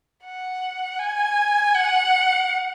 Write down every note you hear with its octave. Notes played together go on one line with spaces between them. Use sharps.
F#5
G#5
F#5